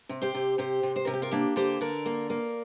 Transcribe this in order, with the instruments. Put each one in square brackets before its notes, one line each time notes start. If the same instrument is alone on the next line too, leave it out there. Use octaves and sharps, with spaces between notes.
[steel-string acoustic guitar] C3
G4 C5
C3
C3 G4 C5
C3
C5
C3 A#4
G4
F4 A#4
A#3 D4 G4
D3 G4 C5
D3 A#4 D5
A#3
A#3